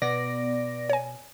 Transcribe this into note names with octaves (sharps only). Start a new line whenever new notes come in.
B2 B3 D5 A#6
C#5 G#5